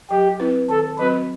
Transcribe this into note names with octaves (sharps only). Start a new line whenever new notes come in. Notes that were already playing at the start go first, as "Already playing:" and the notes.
F#3 G4
C4 E4 B4
D#3 A4
F#3 C4 F#4 B4